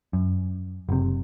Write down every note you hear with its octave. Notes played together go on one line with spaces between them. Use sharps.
F#2
F#1 C3